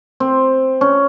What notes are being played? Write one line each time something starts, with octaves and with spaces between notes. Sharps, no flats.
C4
C#4